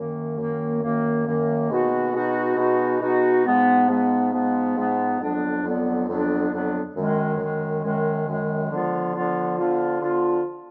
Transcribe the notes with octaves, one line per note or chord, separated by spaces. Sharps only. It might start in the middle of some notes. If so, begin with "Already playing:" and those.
Already playing: F#2 D#3 A#3
F#2 D#3 A#3
F#2 D#3 A#3
F#2 D#3 A#3
B2 G#3 B3 D#4 F#4
B2 G#3 B3 D#4 F#4
B2 G#3 B3 D#4 F#4
B2 G#3 B3 D#4 F#4
G#2 F3 G#3 B3
G#2 F3 G#3 B3
G#2 F3 G#3 B3
G#2 F3 G#3 B3
F2 D3 F#3 B3 D4
F2 D3 F#3 B3 D4
F2 D3 F#3 B3 D4
F2 D3 F#3 B3 D4
F#2 D#3 G#3
F#2 D#3 G#3
F#2 D#3 G#3
F#2 D#3 G#3
D3 F3 B3 F4
D3 F3 B3 F4
D3 F3 B3 F4
D3 F3 B3 F4